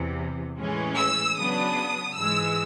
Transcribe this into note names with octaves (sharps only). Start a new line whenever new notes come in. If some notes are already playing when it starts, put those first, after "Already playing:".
Already playing: E2 C3 E3
A2 E3 G#3 C#4
E6
C#3 F#3 B3 D4 D#6
G#2 E3 G#3 E6